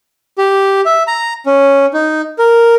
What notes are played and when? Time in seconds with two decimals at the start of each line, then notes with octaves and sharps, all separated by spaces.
0.38 G4
0.85 E5
1.07 A#5
1.46 C#4
1.94 D#4
2.39 A#4